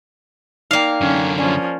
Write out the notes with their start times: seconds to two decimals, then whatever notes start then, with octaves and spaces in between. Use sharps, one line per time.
0.71 A#3 D#4 D5 F5 G5
1.01 F#2 D3 C#4
1.38 F3 C#4 D5 G#5